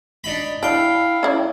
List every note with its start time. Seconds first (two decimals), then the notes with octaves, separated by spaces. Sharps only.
0.24 D4 D#4 B5
0.63 D4 E4 F5 G5
1.23 C#4 E4 D5